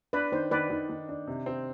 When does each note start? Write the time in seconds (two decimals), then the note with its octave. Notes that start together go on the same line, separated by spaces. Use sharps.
0.13 D4 B4
0.32 D#3 C5
0.51 D#3 B4 D5
0.70 D#3
0.89 D#3
1.09 D4
1.27 C3
1.46 C4